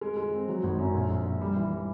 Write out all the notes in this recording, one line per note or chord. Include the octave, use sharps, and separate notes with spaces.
G#3
G#3
C4
F#3
G#1
F#2
A#1
A#1
A#1
G3
E3
G3